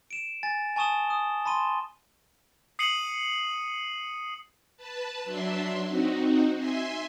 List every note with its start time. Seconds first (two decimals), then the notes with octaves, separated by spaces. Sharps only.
0.11 D7 E7
0.43 G#5 A6
0.76 G#5 A5 C#6 D#6 E7 G7
1.10 D#6
1.45 A5 B5 C6 D#7 G7
2.79 D#6 C7 C#7 D#7 F#7
4.77 B4 A5
5.24 F#3 D4 E5 C6
5.88 C4 D#4 F#4
6.57 E5 G#5 C6